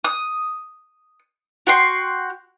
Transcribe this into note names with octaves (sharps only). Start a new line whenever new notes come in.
D#6
F#4 G5 C6